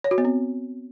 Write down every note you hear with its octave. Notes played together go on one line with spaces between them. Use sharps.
C#5
F#4
B3
C4